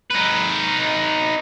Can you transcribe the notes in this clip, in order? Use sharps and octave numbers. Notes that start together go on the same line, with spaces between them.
D#4 B4